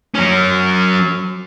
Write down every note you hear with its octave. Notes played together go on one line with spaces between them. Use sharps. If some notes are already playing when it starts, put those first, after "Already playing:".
F#3 C#4